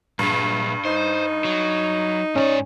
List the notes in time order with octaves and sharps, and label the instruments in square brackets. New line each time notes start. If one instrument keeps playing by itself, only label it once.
[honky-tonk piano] G2 [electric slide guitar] A#2 G#4
[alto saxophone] D#4 [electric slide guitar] C5
[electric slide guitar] F#3
[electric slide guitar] G#2 A4 D5 [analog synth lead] C#4